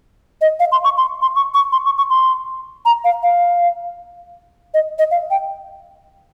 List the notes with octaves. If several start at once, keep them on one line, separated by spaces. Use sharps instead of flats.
D#5
F5
C6
C#6
C6
C6
C#6
C#6
C6
C#6
C#6
C6
A#5
F5
F5
D#5
D#5
F5
G5